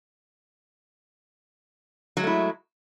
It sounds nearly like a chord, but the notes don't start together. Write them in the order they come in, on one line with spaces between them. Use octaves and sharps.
F#3 G#3 A3 E4